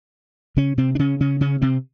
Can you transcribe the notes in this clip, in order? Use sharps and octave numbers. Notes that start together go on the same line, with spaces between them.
C#3 C#4
C3 C4
D4
C#3 C#4
C#3 C#4
C#3 C#4
C3 C4